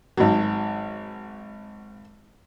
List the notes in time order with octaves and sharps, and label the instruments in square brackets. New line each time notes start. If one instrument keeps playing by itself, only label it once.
[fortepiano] G#1 F#3